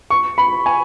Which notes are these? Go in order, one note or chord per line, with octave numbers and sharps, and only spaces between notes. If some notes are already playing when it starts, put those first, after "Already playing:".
C#6
B5
G#5